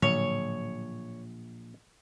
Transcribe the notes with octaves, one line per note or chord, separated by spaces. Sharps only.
A#1 A2 D3 F#3 C#5